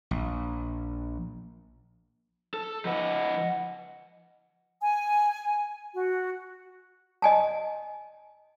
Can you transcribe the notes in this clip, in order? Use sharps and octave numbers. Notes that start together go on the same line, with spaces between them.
A#1
A4
F3 B4 D#5 F#5
G#5
F#4
D#5 G#5 A5